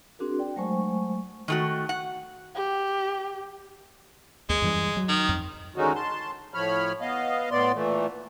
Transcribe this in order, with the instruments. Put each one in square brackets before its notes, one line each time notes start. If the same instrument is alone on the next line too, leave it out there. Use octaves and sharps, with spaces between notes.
[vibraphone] C4 D4 F#4 G#4 A#4
D5 G5
F#3 G#3 A3 C5 G#5 C#6
[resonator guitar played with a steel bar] D#3 A3 F#4
F#5
[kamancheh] G4
[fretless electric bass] D#2 [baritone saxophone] G#3
[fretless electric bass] F#2 E3 G3
F#3
[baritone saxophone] D#3
[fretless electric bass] F2
[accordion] D3 D#3 G#3 C#4 D#4 F#4
A5 C6
A2 F3 C#5 B5 F6
B3 D#5 F5
A2 B3 D5 C6
A#2 E3 A3